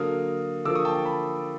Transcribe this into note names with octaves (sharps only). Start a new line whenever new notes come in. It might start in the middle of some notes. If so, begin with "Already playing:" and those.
Already playing: D3 F#3 A#3 D#6 F6
D3 F3 A#3 D6 E6
C#6 D#6
G5 A5
G5 A5
A5 B5